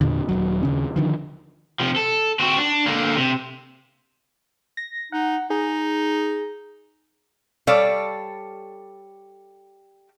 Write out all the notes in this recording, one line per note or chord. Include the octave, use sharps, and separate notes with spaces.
E2 A#2 D3
D#1 D#2 F#3
D#2 C#3 C#4
D3 D#3 F3
C3 F3
A4
C4 F#4
D4
D3 A#3
C3
A#6
D#4 F#5
D#4 G#4
G3 A4 C#5 D5 F5